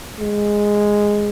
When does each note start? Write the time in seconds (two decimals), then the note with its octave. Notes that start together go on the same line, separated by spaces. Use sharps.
0.20 G#3